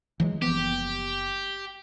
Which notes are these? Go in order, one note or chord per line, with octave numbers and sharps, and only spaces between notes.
E3 F#3 G#3
F#1 F3 B3 G4